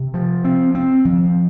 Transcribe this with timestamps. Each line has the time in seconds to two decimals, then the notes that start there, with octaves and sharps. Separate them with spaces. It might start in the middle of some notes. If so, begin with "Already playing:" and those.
Already playing: C3
0.14 F3
0.44 C4
0.75 C4
1.05 F3